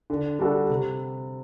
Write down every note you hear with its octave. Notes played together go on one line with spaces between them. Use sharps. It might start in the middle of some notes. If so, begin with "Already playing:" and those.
D3
G3 D4 F#4 A4
C3